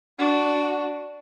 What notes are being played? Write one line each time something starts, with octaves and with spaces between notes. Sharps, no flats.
D4 F#4